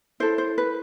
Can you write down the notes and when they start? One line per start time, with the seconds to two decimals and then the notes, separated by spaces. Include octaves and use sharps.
0.20 E4 A4 C5
0.38 C5
0.58 B4